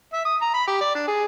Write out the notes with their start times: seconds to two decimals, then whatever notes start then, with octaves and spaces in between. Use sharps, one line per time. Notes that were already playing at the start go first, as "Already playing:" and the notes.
0.13 E5
0.25 D#6
0.42 A#5
0.54 B5
0.67 G4
0.81 D5
0.95 D4
1.08 G#4